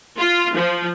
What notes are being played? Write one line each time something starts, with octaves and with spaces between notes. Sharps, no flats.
F4
F3